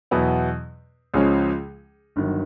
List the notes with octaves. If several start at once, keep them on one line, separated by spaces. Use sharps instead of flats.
E2 B2 F#3 B3 E4
C#2 C#3 F3 G#3 C#4
G1 G2 D#3 F#3